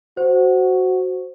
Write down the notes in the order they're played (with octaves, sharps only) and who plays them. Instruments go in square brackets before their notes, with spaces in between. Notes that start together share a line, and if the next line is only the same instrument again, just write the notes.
[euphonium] F#4 [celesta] C5